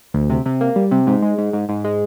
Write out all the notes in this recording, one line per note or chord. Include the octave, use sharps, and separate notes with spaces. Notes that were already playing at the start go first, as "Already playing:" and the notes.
D2
C3
C3
A#3
G3
C3
G#2
G#3
G#2
G#2
G#2
G#3